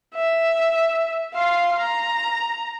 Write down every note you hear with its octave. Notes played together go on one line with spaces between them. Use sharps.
E5
F5 C6
A#5